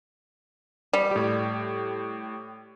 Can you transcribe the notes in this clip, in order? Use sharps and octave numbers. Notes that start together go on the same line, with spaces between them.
G3
A2 G4